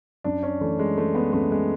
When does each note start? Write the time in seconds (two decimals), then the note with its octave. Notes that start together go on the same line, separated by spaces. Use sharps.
0.24 F#2 D4
0.43 C#4
0.61 E3 A3
0.79 G#3
0.97 E3 A3
1.15 B3
1.33 F#2 A3
1.52 G#3